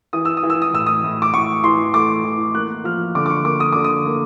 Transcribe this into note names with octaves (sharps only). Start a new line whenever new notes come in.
E3 D#6
E6
D#6
E3
E6
D#6
A2 E6
D#6
A2
D6
A2 C#6
E3 C6
A3 D6
E3
A#3 F#6
F3 F6
D3 D6
D6
C#6
A#3 D6
D#6
D3 D6
D#6
A#3